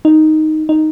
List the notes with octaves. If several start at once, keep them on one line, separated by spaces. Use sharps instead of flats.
D#4
D#4